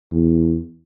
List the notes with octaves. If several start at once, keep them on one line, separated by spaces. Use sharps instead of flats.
E2